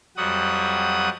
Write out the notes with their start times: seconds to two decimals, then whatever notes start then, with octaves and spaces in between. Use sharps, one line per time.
0.17 F2 F#3 G3 F#4 F#5 D#6